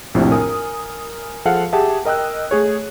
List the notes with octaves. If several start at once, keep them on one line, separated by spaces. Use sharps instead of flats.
A#1 F2 A2 C3
A#4 G#5 D#6
F3 G#4 A4 F5 F#5
G4 G#4 E5 F#5 A5
A#4 D#5 G5 E6 F#6
A3 G#4 C#5